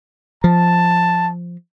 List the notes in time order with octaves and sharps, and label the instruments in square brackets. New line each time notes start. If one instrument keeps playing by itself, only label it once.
[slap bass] F3 [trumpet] A5